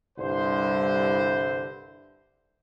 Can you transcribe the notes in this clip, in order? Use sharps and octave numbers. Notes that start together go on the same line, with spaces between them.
C2 G2 D3 E4 C5